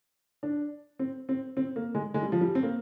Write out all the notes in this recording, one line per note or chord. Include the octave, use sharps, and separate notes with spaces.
D4
C4
C4
C4
A#3
G#3
G#3
G3
F3
G3
C4
A#3